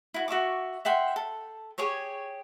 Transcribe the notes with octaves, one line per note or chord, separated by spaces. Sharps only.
E4 F#4
F#4 E5 C#6 D6
E5 F#5 G5 C6
A4
G4 G#4 C#5 C#6